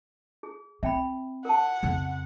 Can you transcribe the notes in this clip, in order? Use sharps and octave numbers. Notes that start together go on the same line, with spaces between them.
G#4
C4 E5 G5 B5
A#4 F#5 A5
F2 C#3